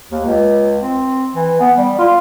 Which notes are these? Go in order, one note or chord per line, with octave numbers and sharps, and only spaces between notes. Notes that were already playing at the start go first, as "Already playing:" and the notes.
D#2
C#2
C4
E3
B3
G3
F4